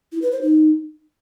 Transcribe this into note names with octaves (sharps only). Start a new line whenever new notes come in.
E4
B4
C5
D#4